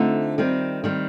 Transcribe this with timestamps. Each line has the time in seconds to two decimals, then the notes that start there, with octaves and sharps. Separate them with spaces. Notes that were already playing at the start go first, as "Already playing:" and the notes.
Already playing: D3 A3 C4 D#4 F4
0.38 D#3 G3 C4
0.84 D#3 G3 C4